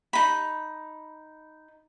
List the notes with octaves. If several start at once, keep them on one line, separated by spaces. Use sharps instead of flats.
D#4 B5